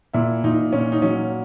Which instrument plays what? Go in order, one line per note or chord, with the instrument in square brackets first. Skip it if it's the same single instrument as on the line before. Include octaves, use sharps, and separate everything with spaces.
[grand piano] A#2 E4
A#2 D#4
A#2 C#4
D#4
F#3 C#4